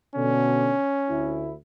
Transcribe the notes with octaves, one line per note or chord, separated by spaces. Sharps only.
B2 D3 C#4
D2 E4